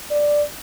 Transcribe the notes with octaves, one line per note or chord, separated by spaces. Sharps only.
D5